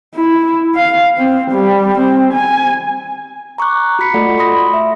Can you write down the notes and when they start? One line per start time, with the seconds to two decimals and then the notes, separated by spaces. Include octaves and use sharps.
0.15 E4
0.74 F5
1.17 C4
1.51 G3
1.99 C4
2.33 G#5
3.58 A#5 C#6 D6 F#6
3.99 F#4 B5 B6 C#7
4.14 A3 F4 A4 D5 F#5
4.38 B5 C6 D#6 A#6
4.74 E5